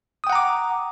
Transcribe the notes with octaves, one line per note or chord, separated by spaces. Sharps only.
F#5 G5 A#5 D6 D#6